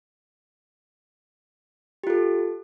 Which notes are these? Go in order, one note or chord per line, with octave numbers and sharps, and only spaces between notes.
F4 G4 A4